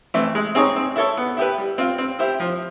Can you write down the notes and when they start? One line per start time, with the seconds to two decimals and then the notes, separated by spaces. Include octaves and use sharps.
0.14 E3 A3 C4
0.35 G#3
0.55 C4 D#4 G#4 C#5
0.76 C4
0.96 E4 A4 C#5
1.17 B3
1.37 E4 G4 B4
1.58 G3
1.78 C4 F4
1.98 C4
2.19 E4 G4 C5
2.40 F3